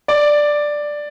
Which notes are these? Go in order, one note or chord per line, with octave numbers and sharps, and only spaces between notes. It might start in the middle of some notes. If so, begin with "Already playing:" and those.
D5